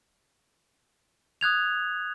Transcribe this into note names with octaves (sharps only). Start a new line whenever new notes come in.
D#6 F#6 G#6 F7